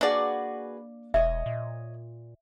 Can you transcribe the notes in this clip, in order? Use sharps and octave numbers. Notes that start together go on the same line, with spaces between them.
A#3 D4 F#4 G#4 B4 D5
E1 C#5 D#5 E5
A#2